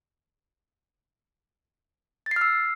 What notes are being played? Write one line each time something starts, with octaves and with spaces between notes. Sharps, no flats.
A6
C7
F6
E6